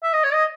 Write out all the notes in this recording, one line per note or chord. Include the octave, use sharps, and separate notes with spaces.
E5
D#5
C#5
D#5